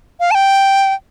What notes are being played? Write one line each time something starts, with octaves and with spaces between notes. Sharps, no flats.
F5
A5
G5